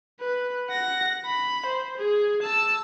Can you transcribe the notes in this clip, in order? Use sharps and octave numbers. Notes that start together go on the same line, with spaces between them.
B4
F#5 A#6
B5
C5
G#4
A5 E6